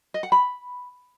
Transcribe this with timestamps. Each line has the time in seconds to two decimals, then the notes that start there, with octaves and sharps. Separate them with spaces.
0.14 D#5
0.23 F#5
0.32 B5